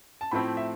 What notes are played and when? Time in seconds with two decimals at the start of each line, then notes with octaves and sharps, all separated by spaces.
0.21 A5
0.31 A2 F3 A3 C4 E4 B5
0.57 E5